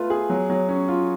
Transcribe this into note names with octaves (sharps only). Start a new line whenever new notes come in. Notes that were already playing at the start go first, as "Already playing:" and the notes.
Already playing: A3 F4 B4
G#4
F#3
F#3
C#4
F4